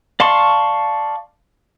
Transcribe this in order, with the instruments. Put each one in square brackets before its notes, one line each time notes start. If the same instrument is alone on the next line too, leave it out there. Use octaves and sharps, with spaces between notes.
[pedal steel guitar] D5 F5 A5 C6 C#6